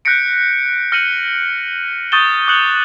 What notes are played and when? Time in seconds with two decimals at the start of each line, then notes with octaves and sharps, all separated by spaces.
0.05 F#6 G6 A#6 B6 C#7 D7
0.92 F6 A#6 C#7 D#7 F#7
2.12 C#6 D#6 G6 A6 E7 G7
2.47 D6 D#6 F#6 C#7 F#7